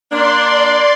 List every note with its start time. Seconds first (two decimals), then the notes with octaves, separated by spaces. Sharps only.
0.12 A#3 D4 D5 C6